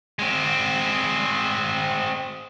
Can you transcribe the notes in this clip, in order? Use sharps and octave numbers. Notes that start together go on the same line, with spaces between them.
G#3 C4